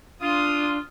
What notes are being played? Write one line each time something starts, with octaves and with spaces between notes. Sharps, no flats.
D4 F4 D#6